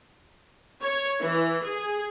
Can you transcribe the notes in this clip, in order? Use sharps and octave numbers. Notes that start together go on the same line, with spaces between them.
C#5
E3
G#4